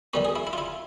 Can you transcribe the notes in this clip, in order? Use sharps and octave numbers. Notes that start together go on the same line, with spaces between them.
D#3 G3 B3 F#4
G#4
E4
E4
F4
E4